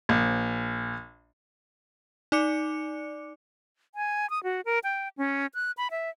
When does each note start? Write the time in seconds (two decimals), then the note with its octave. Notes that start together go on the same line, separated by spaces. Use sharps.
0.09 A#1
2.32 D#4 D5 D6 C#7
3.95 G#5
4.30 D#6
4.44 F#4
4.65 A#4
4.84 G5
5.17 C#4
5.54 F#6
5.77 B5
5.91 E5